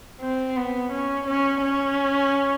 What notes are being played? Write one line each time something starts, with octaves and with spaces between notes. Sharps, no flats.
C4
B3
C#4
C#4
C#4